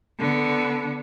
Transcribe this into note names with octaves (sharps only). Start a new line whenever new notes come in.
D3 B3